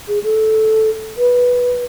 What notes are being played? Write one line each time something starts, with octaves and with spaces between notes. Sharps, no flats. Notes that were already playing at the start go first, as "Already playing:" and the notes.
G#4
A4
B4